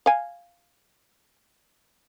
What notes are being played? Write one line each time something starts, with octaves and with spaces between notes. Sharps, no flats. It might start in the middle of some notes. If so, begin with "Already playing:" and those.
F5 G#5